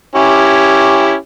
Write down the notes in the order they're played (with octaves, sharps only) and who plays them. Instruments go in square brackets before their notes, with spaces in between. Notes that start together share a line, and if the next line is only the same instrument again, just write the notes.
[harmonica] C#4 E4 G4